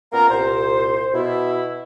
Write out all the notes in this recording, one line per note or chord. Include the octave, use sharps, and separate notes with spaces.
A#2 A#3 B3 C#4 A#4 A#5
C2 A#2 C5
B2 E4